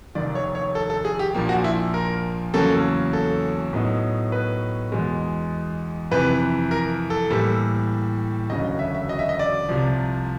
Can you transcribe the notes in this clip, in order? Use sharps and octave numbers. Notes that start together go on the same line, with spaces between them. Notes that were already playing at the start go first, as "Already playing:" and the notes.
F1 D#2 D#3 D5
C#5
C#5
A4
A4
G#4
G4
A#1 A#2 F3 A#3
F#4
E4
A#4
E2 C#3 F#3 A#3 C#4 A4
A4
A2 F#3 B3 D#4
B4
E2 B2 G#3
F2 C3 E3 B4
A#4
A4
A2 E3 G3 A#3
E1 D2 C#3 F#3 D#5
D#5
E5
E5
D#5
E5
D#5
D5
C2 C3 F3